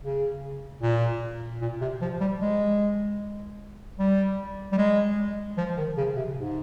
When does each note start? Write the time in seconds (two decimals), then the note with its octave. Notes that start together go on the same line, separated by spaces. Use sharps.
0.03 C#3
0.82 A#2
1.61 A#2
1.81 C3
2.01 F3
2.21 G3
2.41 G#3
3.99 G3
4.72 G3
4.78 G#3
5.58 F3
5.77 D#3
5.97 C#3
6.17 C3
6.37 G#2